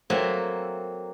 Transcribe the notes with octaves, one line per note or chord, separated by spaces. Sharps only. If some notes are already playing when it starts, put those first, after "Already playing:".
F#3 A#3 C4 A4 A#4 E5